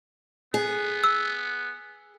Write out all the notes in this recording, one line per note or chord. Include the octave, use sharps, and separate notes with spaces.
B3 G#4
E6